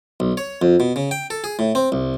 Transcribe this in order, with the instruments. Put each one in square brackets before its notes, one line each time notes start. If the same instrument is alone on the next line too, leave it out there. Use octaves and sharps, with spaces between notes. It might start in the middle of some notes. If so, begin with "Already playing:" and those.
[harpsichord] B1
C#5
F2
B2
C#3
G5
A4
G#4
A2
C4
C2